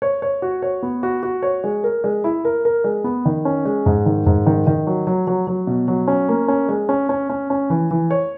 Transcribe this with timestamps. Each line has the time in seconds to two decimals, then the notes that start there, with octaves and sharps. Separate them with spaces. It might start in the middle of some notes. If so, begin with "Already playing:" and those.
0.02 C#5
0.22 C#5
0.42 F#4
0.62 C#5
0.83 B3
1.03 F#4
1.23 F#4
1.43 C#5
1.64 G#3
1.84 A#4
2.04 G#3
2.24 E4
2.45 A#4
2.65 A#4
2.84 G#3
3.04 B3
3.25 D#3
3.45 C#4
3.65 G#3
3.86 G#2
4.06 D#3
4.26 G#2
4.46 D#3
4.67 D#3
4.87 F#3
5.07 F#3
5.27 F#3
5.47 F#3
5.67 B2
5.88 F#3
6.08 C#4
6.29 A#3
6.48 C#4
6.69 G#3
6.89 C#4
7.09 C#4
7.30 C#4
7.50 C#4
7.70 E3
7.91 E3
8.11 C#5